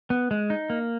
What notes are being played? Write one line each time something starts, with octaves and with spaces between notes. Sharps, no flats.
B3
G#3
D#4
A#3